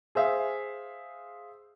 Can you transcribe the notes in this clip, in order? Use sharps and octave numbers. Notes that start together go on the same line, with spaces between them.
G#4 C5 E5 F5